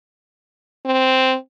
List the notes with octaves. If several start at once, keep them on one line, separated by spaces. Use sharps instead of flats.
C4